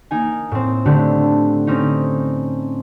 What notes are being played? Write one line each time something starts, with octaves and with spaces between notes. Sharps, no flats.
A#3 D#4 G#5
A2 C4
D3 A3 D4 G4
C4 C#4 D#4